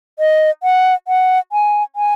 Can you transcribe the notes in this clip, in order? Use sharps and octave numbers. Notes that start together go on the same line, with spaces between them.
D#5
F#5
F#5
G#5
G#5